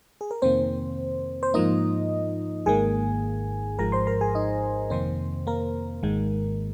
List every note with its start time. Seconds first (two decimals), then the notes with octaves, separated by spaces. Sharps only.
0.21 G#4
0.31 A#4
0.42 F2 C3 D#3 A#3 C4 C5
1.43 C5
1.54 G#2 F3 A#3 D#4 D#5
2.66 G#1 G#2 D#3 A#3 G#4 G#5
3.79 G#1 G#2 F3 G#3 A#4 A#5
3.92 C5 C6
4.07 A#4 A#5
4.21 G#4 G#5
4.35 D#4 D#5
4.90 F2 C3 D#3 A#3 C4 C5
5.47 A#3 A#4
6.03 G#1 G#2 D#3 G#3